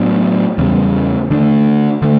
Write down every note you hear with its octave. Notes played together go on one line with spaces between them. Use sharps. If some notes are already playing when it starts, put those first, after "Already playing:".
Already playing: A2 F#3 B3 D4
E2 C#3 G3
D3 A3 D4
D3 A3